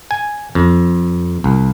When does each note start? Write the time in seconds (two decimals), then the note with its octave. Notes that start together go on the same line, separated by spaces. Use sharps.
0.11 G#5
0.55 F2
1.44 C2